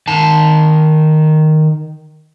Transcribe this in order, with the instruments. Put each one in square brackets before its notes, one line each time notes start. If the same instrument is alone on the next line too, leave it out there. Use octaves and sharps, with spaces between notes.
[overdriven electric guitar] D#3 A5